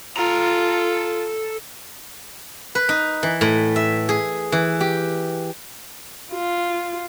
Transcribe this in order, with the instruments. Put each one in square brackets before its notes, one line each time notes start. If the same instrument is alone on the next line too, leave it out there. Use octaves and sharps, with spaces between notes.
[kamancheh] F4 [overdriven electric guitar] A4 A#5
[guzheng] B4
D#4
E3
A2
E5
G#4
E3
G4
[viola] F4